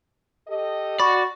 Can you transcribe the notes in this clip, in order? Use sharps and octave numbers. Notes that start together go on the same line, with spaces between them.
G4 A4 D#5
F#4 D5 B5 C#6